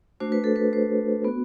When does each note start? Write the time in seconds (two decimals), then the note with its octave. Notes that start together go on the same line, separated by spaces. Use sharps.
0.20 A3 D4 F#4 C5
0.32 B4
0.44 A4
0.56 B4
0.73 C5
1.24 B3 F#4